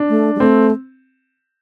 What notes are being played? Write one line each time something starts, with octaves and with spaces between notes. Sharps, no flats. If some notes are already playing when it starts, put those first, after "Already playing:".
Already playing: D4
A3
G3
A3 C4